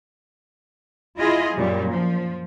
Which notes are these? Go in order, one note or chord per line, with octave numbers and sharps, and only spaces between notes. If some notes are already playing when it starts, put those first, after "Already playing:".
E4 F4 G#4 D#5
F#2 A#2 G3
F3